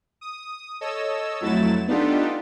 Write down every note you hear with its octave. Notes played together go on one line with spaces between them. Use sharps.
D#6
A4 C#5 D#5 E6
F2 F#3 A3 E4 A6 E7
B3 D4 D#4 F4 G4 A4